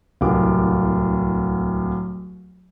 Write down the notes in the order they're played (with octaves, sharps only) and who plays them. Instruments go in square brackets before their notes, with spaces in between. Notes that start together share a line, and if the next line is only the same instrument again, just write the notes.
[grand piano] D1 C2 D6